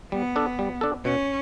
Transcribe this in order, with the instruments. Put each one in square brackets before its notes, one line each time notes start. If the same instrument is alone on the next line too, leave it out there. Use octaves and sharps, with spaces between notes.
[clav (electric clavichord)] G3 [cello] B3
[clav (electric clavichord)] D4 A4
G3
D4 A4
[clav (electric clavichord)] B2 [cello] C#4